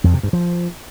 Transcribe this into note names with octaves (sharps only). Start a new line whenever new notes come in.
F2
C3
G2
F3